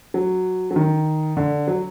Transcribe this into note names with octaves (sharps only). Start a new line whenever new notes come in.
F#3
F#3
D#3
D3
F#3